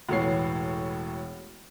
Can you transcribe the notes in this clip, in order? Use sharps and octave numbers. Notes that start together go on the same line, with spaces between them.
E1 A2 B3 C#5 C7